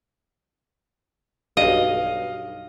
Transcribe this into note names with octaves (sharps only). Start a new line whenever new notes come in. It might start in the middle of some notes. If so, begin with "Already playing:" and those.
B1 G2 D#5 F5